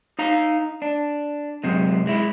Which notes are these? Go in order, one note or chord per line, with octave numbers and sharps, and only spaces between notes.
D#4 F5 A#5
D4
F#2 C3 G#3
G#3 E4